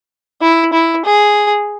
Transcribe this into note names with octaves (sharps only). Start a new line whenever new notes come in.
E4
E4
G#4